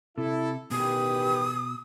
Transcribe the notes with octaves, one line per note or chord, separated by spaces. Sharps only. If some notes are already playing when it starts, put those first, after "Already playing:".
C3 E4 A4
A1 B2 D#3 G4 B4 D#6